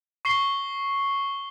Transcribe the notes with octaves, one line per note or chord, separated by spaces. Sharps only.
C#6 C7 G7